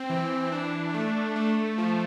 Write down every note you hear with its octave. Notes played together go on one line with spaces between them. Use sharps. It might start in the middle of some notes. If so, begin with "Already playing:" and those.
Already playing: C4
E3
D4
A3
A3
F3